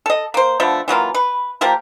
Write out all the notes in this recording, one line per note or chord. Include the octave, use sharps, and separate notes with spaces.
A4 D#5
A#3 C5
D3 F3 A3 B3
E3 F#3 A#3 F4
B4
F3 A#3 G4 A#4